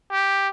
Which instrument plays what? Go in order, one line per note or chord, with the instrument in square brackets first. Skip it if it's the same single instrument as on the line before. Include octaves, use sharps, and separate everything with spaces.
[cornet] G4